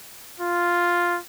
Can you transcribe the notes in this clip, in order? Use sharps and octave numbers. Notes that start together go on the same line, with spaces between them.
F4